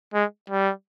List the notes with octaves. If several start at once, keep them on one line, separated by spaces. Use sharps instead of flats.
G#3
G3